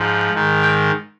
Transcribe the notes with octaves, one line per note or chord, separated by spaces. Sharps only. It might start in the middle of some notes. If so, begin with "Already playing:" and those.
Already playing: G#2 F3
G#2 D#3
G5